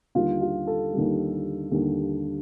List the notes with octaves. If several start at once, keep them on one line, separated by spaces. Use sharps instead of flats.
D#2 D3 G3 F4
F4
A4
D#2 D3 G3
D#2 D3 G3